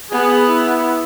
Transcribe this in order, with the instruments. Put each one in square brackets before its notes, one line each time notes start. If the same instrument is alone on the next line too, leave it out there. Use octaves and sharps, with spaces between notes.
[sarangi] B3 [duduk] G#4
[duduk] E4